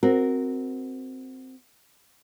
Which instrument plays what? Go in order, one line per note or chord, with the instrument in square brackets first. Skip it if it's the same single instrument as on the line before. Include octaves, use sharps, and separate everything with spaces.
[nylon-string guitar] C4 F#4 A#4